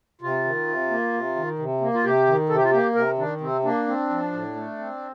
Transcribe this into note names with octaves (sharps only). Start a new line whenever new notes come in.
C3 F4
D#3
C3
A#3
C3
D#3
C3
A#3
F4
C3 G4
D#3
C3 A4
G4
F4
A#3 G4
C3 A#4
D#3 D4
C3 C4
A#3 D4
C4
F3
A2
A3
C4